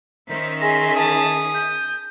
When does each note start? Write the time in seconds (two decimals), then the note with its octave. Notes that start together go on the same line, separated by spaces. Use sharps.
0.30 D#3 C#4 C5 E5
0.61 G#4 C6 A#6
0.96 A5 D#6
1.54 G6